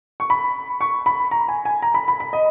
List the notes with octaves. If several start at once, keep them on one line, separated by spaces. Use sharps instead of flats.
C#6
B5
C#6
B5
A#5
G#5
G#5
A#5
B5
B5
B5
D#5